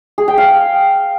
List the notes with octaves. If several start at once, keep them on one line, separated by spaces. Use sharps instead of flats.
G#4
G5
F5